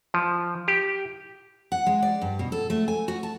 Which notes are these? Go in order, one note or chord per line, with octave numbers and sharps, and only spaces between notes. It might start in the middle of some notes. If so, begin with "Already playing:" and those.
F3
G4
F#5
G#3
D5
G2
B2
A4
A3
G#5
F#4
A5